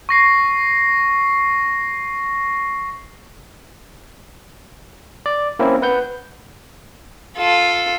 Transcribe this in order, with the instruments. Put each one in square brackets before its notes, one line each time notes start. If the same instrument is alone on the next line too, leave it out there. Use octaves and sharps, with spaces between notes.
[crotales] C#6 A#6 C7
[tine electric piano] D5
A#3 C4 C#4 E4
B4 F#5 G6
[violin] F4 A4